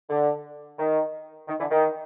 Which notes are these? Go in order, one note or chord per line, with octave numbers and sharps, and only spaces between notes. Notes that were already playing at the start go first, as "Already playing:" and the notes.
D3
D#3
D#3
D3 E3
D#3